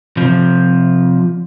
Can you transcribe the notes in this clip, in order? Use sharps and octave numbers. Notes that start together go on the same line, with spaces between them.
C3 F3